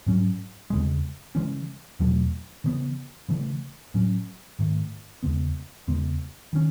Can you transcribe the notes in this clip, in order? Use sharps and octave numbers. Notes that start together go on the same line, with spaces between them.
G#2 F#3 C#4
E2 C#3 G#3
C#3 E3 G#3 C#4
E2 B2 F#3 A3
C#3 E3 G#3 B3
C#3 E3 A3
A2 F#3 C#4
G#2 D#3 A3
E2 C#3 G#3 B3
E2 C#3 G#3 B3
D#3 A3 C#4